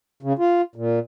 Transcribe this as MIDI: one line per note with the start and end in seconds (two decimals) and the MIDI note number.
0.23 0.33 49
0.39 0.61 65
0.76 0.99 46